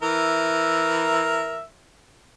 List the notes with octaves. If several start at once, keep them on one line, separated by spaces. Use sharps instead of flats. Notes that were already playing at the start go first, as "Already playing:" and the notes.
E3 A#4 E5